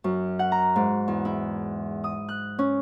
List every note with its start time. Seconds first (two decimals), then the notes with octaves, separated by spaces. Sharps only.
0.04 F#2
0.39 F#5
0.52 A#5
0.76 G#2
1.08 E2
1.25 E4
2.04 D#6
2.29 F#6
2.59 C#4